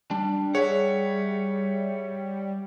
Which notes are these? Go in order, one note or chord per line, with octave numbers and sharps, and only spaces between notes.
G3 D4
G#4 C#5 E5 F#5